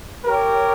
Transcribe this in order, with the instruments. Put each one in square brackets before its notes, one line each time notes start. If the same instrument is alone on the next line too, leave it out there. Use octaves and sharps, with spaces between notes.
[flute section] G4 C#5 G5 C#6 [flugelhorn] A#4